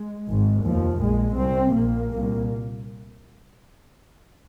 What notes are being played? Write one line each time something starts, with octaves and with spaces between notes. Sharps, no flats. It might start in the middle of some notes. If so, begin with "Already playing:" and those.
Already playing: G#3
G#1 G#2
F1 D#2 F3
A#1 A#2 G#3
C2 C3 C4
A#1 A#2 A#3
C2 A#2